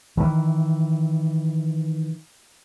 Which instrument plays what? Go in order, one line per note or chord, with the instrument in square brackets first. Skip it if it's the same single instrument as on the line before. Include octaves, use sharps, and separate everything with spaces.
[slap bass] D#3 E3